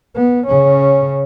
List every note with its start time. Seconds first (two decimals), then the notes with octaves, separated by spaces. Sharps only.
0.16 B3
0.47 C#3 C#4